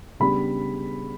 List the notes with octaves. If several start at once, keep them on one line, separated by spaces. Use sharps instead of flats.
C#3 G3 B3 D4 B5